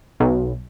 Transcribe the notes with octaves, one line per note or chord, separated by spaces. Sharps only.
B1